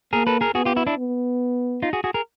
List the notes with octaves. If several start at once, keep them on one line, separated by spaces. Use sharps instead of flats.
A#3 G#4 A#4
A4 B4
G#4 A#4
B3 F#4 G#4
F4 G4
E4 F#4
D4 E4
B3
D#4 F4
F#4 G#4
F#4 G#4
G#4 A#4